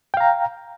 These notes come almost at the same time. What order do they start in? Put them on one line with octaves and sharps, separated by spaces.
G5 F5 A#5